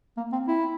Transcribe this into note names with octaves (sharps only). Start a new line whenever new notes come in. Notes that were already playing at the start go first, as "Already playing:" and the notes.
A#3
C4
E4